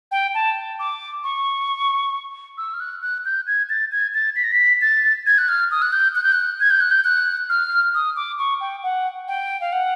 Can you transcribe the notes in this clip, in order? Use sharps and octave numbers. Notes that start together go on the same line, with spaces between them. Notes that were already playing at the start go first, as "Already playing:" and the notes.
G5
A5
D6
C#6
E6
F6
F#6
F#6
G6
G#6
A6
G#6
A6
B6
A#6
B6
A6
G#6
F#6
F6
D#6
F#6
G6
F#6
G6
F#6
G#6
G6
F#6
G6
F#6
F6
D#6
D6
C#6
G5
F#5
G5
F5
F#5